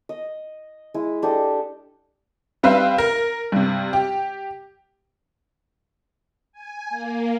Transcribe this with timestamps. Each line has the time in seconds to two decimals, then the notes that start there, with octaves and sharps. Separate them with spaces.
0.09 D#5
0.94 G#3 E4
1.22 D4 G4 A4 D#5
2.63 G3 C4 B4 E5 F5
2.98 A#4
3.52 G2 C3
3.93 G4
6.52 G#5
6.90 A#3